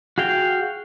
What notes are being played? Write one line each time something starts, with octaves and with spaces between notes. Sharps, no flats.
F#4 G#4 F5 G5